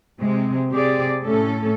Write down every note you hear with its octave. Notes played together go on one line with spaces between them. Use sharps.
C3 G#3 C4
C3 C4 G4 G#4 D5
A2 A3 C#4 A4